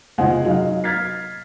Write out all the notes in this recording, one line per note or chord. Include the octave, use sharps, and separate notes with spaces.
C3 G#3 F4 C5 F#5 G#5
F#3 D#4 D#5 F5
F6 G#6 A6 B6 C7